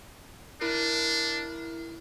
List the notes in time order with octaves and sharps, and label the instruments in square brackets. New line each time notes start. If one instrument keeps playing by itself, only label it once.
[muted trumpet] D4 [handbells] E4 A#4